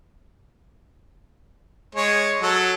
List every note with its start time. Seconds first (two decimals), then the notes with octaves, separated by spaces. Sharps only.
1.95 G#3 C#5
2.42 F#3 A4